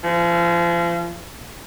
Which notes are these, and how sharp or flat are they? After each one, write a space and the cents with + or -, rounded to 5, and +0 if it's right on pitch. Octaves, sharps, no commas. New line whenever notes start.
F3 -35